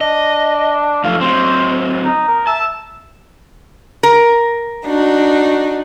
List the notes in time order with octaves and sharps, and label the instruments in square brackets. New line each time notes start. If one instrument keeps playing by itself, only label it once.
[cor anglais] D4 [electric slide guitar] D#5
[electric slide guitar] F#2 F3 A3 [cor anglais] F5
[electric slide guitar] F#3 C4 [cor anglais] C5
[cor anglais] D#4
A#4
[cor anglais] E5 [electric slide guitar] A5
[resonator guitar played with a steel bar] A#4
[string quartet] D4 D#4 F#4